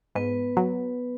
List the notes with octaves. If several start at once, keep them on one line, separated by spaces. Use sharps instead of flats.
G#2 B3 B4
F#3